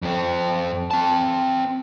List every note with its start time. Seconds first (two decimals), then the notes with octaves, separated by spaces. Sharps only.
0.02 F2 C4
0.91 C4 A5